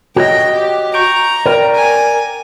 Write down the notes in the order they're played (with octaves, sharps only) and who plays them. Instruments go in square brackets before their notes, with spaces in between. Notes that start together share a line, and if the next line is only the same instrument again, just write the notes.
[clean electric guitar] F#4 C#5 D#5 [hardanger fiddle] G5
[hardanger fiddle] G4
[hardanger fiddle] A#5 [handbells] C#6 G6 D7
[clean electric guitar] A#4 [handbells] D5 G5
[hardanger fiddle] G#5